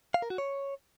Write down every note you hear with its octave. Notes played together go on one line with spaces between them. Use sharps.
F5
A#4
F#4
C#5